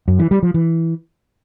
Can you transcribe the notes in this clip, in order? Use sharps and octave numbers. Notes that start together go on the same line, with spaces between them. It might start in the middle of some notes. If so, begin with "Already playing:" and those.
F#2
E3
G3
F3
E3